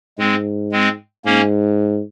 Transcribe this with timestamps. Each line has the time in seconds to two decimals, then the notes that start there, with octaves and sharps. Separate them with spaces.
0.18 G#2 G#3 C4
0.72 G#3 C4
1.25 G#2 A#3 C#4